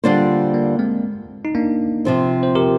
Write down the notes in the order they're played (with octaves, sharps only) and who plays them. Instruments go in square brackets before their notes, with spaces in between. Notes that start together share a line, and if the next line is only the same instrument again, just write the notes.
[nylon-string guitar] D3 G3 D4 F4 C5 [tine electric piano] A#3
[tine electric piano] A#3
G#3 C4
D#4
A#3 D4
[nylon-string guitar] C3 F3 C4
[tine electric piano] C5
G4 A#4